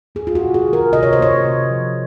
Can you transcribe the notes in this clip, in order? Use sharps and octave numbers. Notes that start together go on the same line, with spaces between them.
A#3 G#4
F4
F#4
C3
G#4
D#3
A#4
C3 D#5
C#5
C5
A#3 C#5
C3
F3